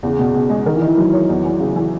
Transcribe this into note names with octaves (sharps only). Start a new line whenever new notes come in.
E2 C#3
B2
B2
G#3
D#3 A#4
E3
D#4
E3
F#3 D#4
C#5
E2
E3
C#3
E3